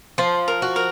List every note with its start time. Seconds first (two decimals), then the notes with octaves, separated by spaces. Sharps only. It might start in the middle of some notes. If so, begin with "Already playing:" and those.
0.18 F3 C5
0.48 A#4
0.62 F#4
0.76 A#4